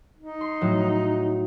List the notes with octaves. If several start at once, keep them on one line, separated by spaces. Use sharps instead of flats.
D#4
C6
A2 F#3